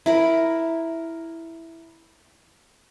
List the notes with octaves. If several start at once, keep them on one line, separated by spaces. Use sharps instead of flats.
E4 A#4 B5